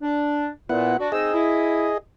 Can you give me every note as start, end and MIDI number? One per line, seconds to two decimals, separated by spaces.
0.02 0.48 62
0.69 0.94 46
0.69 0.97 59
0.69 0.97 64
0.69 0.97 78
0.99 1.08 62
0.99 1.08 66
1.12 1.32 60
1.12 1.32 63
1.12 1.98 68
1.12 1.98 75
1.12 1.32 88
1.34 1.91 64